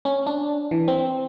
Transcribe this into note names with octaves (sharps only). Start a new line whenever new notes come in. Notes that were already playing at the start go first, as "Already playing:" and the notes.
C#4
D4
E3
C4